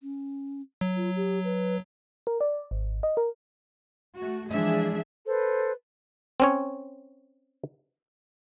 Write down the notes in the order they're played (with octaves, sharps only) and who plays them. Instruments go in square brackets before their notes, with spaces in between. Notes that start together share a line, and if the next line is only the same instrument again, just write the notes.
[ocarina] C#4
[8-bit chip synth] F#3
[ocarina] F4
G4
B4
[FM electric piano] A#4
D5
G#1
D#5
A#4
[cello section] A3 F#4
E3 F3 G#3 D4 G#4 E5
[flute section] A4 B4 C5
[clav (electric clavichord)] C4 C#4 C#5